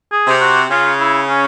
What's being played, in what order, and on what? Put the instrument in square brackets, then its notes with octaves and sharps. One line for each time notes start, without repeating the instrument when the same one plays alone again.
[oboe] G#4
[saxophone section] C3
[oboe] F#4
[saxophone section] C#3 [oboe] F4
[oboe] E4
C#4